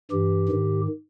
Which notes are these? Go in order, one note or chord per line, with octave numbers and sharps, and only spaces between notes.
G2 E3 G4
G#2 D#3